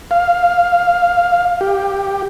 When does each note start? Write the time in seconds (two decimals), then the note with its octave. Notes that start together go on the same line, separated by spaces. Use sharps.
0.11 F5
1.61 G4